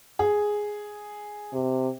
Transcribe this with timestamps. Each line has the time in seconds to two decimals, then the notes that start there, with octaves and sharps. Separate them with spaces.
0.19 G#4
1.53 C3